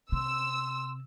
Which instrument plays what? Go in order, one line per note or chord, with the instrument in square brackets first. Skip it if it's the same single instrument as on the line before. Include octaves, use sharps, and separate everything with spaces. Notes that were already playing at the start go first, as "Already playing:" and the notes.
[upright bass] C3 [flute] C6 [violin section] E6